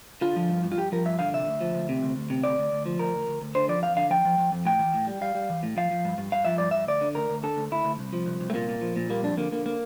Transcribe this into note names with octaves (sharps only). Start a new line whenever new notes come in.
D3 F4
F3
G2
G2
F4
G2 G4
F3 A#4
G2 E5
D3 F5
C3 E5
D2
F3
D2
C3
D2
D2
C3
D2 D5
D2
D2
F3
D2 A#4
D2
D2
D2
D3 C5
F3 D5
F2 F5
D3 F5
F3 G5
F3
F3
F2
A2 G5
E3
A2
G3
G3 F5
G3
E3
A2
F3 F5
F3
G2
G2
G2 F5
F3 E5
G2 D5
G2 E5
D2 D5
D3
D2 A#4
D2
D3 A4
D2
D2 E4
D2
C2
F3
C2
C2
A3
A#2 A#3
A#2
F3
A#2
G3 A#3
F2 D4
D3 A#3
D3 A#3
A#3